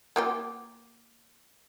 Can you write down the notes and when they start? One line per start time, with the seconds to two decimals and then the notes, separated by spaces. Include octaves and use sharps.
0.16 A#3 F4 G4